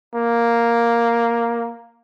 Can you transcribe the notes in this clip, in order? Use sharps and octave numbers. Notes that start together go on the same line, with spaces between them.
A#3